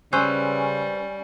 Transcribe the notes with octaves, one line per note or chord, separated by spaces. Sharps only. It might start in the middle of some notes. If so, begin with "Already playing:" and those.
C#3 G3 C#4 B4 C5 E6